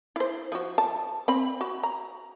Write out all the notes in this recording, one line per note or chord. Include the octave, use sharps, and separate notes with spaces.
E4 C5
F3 F#4
A5
C4 B5
F#4
A#5